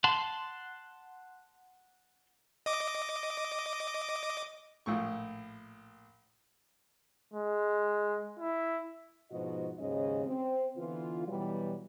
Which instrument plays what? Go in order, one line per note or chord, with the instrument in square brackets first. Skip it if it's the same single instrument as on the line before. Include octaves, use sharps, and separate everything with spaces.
[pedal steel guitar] F#5 A5 C6
[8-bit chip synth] D#5 D6
[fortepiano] A#1 A2 C#6
[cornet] G#3
E4
[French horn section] G#2 B2 F3 D#4 F#4 D#5
D#2 G#2 C#3 F#3 C#4 D#5
C4
D3 E3 B3 F4
B2 E3 F#3 G3